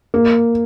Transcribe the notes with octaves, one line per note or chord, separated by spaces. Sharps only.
A#3